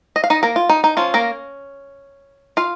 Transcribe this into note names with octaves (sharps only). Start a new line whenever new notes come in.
D#5
F5
D#4 D#5
A#3 A#4
F4
D#4
D#4
F3 C#4 F4
A#3 A#4
F4 F5